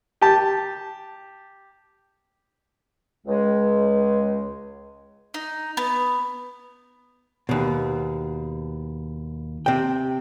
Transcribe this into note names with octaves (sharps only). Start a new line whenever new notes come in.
G4 A5
C#2 G#3
D#4
B3
D#2 B2
C3 G5